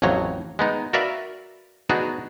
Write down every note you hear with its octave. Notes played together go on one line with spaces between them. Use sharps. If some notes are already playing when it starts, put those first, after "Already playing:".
A1 F2 F3 F#3 C#5
G#3 B3 D#4
F#4 A#4 B4 D5 E5 F5
B3 D4 D#4 F#4 G#4